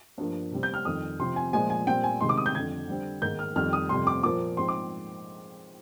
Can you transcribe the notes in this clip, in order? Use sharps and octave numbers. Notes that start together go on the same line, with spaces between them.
G2 F3 A#3
C3 G3 C4
G6
F6
F2 D#3 G3 D#6
C3 F3 C4 C6
G#5
A#2 F3 G#3 G#5
G#5
A#2 G3 C4 G5
G#5
C3 D#3 G#3 C6
D6
D#6
G6
F2 D3 G3 G#6
D3 G3 C4
G#2 D#3 A#3 G6
F6
F2 D#3 G3 F6
D#6
F2 C3 G3 C6
D6
A#2 F3 A#3 D6
G#2 F3 G#3 C4 C6
D6